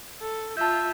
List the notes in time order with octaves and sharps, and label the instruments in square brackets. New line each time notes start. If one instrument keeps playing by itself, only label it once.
[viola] A4
[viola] F4 E5 [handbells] A5 G6